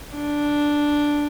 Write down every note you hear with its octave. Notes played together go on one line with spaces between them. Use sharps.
D4